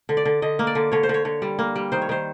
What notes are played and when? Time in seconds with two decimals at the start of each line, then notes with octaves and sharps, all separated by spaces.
0.09 D3
0.17 D5
0.25 D3
0.42 D3 D#5
0.59 A#3
0.67 D5
0.75 D3
0.92 D3 C#5
1.03 C5
1.09 D3 C#5
1.25 D3
1.42 G3
1.59 A#3
1.76 G3
1.92 D#3 C5
2.02 C#5
2.09 D#3 C5